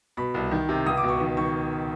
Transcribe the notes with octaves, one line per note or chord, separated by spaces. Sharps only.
B2 B5
C2
D#3
C3
C#2 D#6
D6
B2
C#6
D#3
D#3 C#6